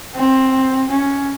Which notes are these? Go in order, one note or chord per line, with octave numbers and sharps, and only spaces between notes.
C4
C#4